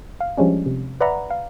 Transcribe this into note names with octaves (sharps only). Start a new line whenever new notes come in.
F5
F3 G3 G#3 C#4 D4
C3
B4 D5 E5 F#5 A#5 B5
F5